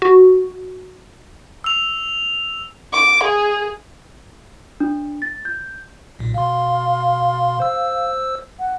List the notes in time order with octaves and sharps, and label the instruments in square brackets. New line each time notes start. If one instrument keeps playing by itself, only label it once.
[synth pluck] F#4
[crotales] E6 F7
[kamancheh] D6
G#4
[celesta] D4
A6
G6
[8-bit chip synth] B1 A#2
[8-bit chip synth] B2 C6 [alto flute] F5
[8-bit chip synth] C5 E6
[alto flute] F#5